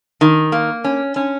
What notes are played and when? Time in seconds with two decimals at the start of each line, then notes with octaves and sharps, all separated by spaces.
0.21 D#3
0.52 A#3
0.84 C#4
1.16 C#4